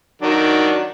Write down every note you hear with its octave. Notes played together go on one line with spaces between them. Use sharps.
D#3 F#3 D4